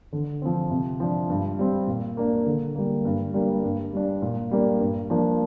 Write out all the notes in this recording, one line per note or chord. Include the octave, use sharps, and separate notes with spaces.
D3
F3 C4
C3
F3 D4
G2
G3 C4
A#2
A#3 D4
D3
G3 A#3
G2
G3 A#3 D4
G2
G3 D4
A#2
G3 A#3 D4
G2
F3 A#3 D4